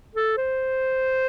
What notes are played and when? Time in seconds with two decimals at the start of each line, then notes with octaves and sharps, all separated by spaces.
0.15 A4
0.37 C5